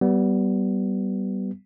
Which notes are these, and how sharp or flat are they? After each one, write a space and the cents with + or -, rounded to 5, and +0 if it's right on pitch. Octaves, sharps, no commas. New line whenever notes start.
G3 -20 B3 +0